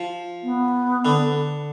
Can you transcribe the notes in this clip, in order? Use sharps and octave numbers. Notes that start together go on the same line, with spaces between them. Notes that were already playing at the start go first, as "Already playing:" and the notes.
Already playing: F3
B3
D3